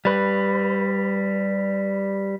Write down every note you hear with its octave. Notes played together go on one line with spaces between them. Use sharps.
G3 B4